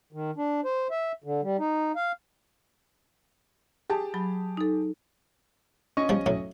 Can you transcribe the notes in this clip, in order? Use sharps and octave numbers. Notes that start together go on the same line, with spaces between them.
D#3
D4
C5
E5
D3
G3
D#4
F5
G4 G#4 A5
F#3 B5
D#4 A4
C#4 D#5 C#6
F3 G3
A2 F#3